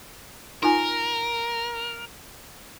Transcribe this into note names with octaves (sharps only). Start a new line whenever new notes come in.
D#4 F4 A#4 G#5